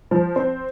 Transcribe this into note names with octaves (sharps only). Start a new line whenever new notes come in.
F3
C4